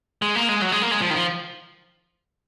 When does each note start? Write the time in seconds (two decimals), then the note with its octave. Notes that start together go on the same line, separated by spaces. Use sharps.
0.22 G#3
0.36 A#3
0.49 G#3
0.62 F#3
0.72 G#3
0.82 A#3
0.91 G#3
1.01 F3
1.10 D#3
1.14 F3